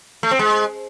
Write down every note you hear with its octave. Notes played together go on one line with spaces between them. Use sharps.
A3
C4
G#3